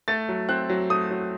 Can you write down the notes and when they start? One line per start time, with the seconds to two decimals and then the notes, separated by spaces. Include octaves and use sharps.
0.08 A3 A6
0.29 F#3
0.49 C4 F#6
0.69 F#3
0.90 A3 D#6
1.10 F#3